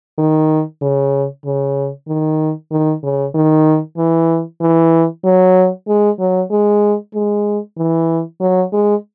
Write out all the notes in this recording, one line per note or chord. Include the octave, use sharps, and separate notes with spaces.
D#3
C#3
C#3
D#3
D#3
C#3
D#3
E3
E3
F#3
G#3
F#3
G#3
G#3
E3
F#3
G#3